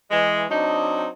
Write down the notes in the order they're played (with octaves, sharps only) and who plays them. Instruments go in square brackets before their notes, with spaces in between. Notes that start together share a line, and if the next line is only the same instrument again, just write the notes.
[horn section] E3 G#3
F#3 C4 D4 D#4